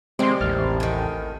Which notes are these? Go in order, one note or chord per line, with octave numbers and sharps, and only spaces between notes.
C3 D#3 G#3 C4 D5 C6
A1 D#2 F6 A6
A2 D#3